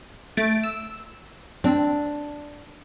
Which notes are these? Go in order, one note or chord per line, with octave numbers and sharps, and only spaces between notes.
A3 A6 D7
E6
C4 D4